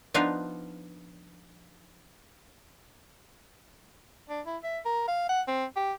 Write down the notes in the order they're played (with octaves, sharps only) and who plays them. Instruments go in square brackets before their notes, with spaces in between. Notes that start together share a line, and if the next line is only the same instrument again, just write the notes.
[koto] F3 B3 D4 D#4 F4 F5
[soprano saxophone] D4
E4
E5
A#4
F5
F#5
C4
G4